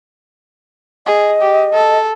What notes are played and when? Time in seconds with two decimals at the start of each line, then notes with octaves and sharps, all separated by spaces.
1.07 G#4 D#5
1.41 G4
1.73 A4